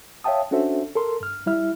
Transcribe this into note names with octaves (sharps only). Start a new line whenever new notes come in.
C#5 E5 F5 G5 A5 D#6
C#4 D4 F#4 A4 C5 E5
A4 A#4 C6
G2 F6
G3 E4 E5 F6